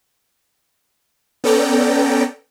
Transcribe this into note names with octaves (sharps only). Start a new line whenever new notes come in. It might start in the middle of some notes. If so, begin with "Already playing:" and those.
B3 C#4 A4 D5 G5 A#5